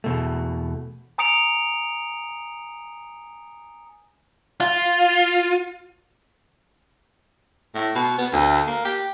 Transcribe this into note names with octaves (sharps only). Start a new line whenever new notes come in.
E2 B2 A3
G#5 A#5 D#6 C#7 D7 F7
F4
A2
B2
B3
D2
A#3
G4